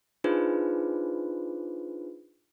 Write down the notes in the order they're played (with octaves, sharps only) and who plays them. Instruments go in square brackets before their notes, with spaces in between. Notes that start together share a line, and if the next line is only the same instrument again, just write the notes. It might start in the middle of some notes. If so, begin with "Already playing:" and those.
[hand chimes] D4 D#4 F4 G#4 B4 C5